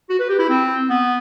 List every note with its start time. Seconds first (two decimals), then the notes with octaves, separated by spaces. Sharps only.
0.10 F#4
0.20 B4
0.29 G4
0.39 E4
0.49 C4
0.90 B3